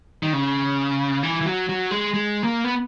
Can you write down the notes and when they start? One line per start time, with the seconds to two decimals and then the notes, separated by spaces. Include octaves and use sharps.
0.23 D#3
0.33 C#3
1.23 E3
1.41 E3
1.46 F#3
1.69 F#3
1.91 G#3
2.14 G#3
2.44 A#3
2.64 B3